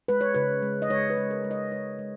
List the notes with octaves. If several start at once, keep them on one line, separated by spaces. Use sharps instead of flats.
G#3 B4
C#5
C#3 B4
G#3
D#5
G#3 C#5
B4
G#3
A#4
G#3
D#5
G#3 C#5
G#3